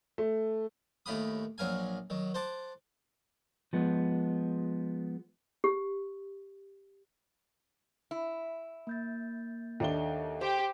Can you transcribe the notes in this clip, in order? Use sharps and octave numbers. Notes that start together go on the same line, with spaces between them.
A3
D#2 A2 G4 F5 B5 D#6
A#1 F#3 A#4 F5 G#5
D#3 F#3
C5 F#5 A5 D6
F3 G#3 B3
G4
E4
A#3 G6 A6
D#2 D4 A4 D#5 E5 G7
G4 C5